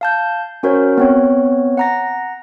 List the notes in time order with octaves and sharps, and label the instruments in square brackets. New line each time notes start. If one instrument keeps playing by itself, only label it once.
[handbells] F5 A5 G6
C#4 F#4 A#4 C5 C#5
B3 C4 C#5
F#5 A#5 A#6